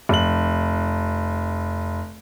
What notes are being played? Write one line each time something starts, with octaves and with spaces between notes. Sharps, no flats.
F1 F#7